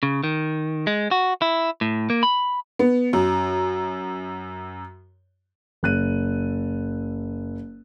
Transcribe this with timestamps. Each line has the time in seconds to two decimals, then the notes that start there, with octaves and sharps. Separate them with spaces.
0.03 C#3
0.24 D#3
0.87 G#3
1.11 F#4
1.42 E4
1.81 A2
2.10 A#3
2.23 B5
2.79 B3
3.13 F#2
5.83 F#1 F#6 D#7